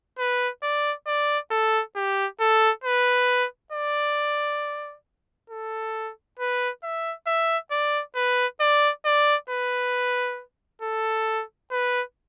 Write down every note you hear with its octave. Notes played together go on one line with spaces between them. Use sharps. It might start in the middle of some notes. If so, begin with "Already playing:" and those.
B4
D5
D5
A4
G4
A4
B4
D5
A4
B4
E5
E5
D5
B4
D5
D5
B4
A4
B4